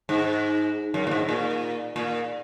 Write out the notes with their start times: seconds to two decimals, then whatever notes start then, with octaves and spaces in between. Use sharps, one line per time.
0.09 G#2
0.94 F#2
1.07 A#2
1.11 G#2
1.29 A#2
1.96 A#2